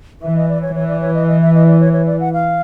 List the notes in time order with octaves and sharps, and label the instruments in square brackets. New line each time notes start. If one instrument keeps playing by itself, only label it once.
[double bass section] E3 [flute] E5
[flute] D#5
D5
C#5
[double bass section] E3 [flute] C#5
[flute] D5
C#5
D#5
D#5
E5
D#5
D5
C#5
C#5
D5
F#5
F5